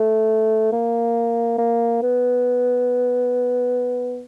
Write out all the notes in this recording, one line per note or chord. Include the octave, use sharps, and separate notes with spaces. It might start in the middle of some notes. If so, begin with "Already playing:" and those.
Already playing: A3
A#3
A#3
B3